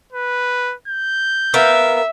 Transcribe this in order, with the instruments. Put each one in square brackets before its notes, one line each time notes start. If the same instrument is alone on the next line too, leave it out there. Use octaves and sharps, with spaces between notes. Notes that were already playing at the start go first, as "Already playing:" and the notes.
[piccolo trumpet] B4
G6
[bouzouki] B3 A#4 F5 [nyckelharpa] E5